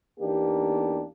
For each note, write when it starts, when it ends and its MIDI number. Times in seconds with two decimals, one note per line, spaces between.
0.20 1.04 40
0.20 1.04 58
0.20 1.04 59
0.20 1.04 62
0.20 1.04 63
0.20 1.04 67